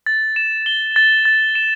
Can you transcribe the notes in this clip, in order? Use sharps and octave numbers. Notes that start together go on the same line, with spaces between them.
A6
E7
G7
A6
A6
E7